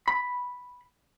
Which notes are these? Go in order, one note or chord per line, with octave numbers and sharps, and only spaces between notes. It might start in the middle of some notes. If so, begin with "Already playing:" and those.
B5